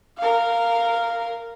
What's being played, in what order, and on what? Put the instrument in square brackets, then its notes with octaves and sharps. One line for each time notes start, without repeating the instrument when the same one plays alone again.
[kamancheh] A#4 F5